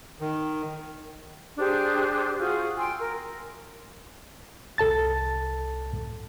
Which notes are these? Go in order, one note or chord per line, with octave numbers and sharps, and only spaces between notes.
D#3
D4 G4 G#4 C5
F4 F#4 G#4 F#5
G5 G#5 C6 E6
A#4
C2 A4 A5 A6